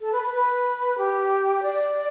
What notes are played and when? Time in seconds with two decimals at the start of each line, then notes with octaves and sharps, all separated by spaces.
0.01 A4
0.12 B4
0.23 B4
0.34 B4
0.98 G4
1.63 D5